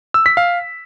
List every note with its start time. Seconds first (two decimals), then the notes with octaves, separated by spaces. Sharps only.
0.14 E6
0.26 B6
0.37 F5